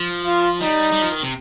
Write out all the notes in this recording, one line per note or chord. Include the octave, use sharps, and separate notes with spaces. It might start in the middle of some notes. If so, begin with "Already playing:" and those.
Already playing: F3
F4
G3 D#4
G3
F3
D#3
C3